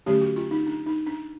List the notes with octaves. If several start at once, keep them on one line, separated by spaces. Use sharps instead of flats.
D3 F#3 A3 C#4 G4
F#4
F4
D#4
D4
D#4
D4